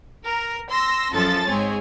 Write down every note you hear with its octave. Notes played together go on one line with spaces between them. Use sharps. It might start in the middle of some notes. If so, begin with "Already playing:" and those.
A#4
C6 E6 A#6
F#2 F3 A4 A5 A6
G#2 C4 G#4 C#5